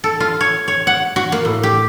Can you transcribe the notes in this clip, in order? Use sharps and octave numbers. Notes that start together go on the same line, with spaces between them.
A4
F4
C#5
C#5
F#5
F#4
A#3
A2
G4